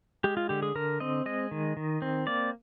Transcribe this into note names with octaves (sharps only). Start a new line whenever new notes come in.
G#3 G4
F4
D3 G4
G#4
D3 A#4
C4 D#5
G#3 D#5
D#3
D#3
C4
A#3 D5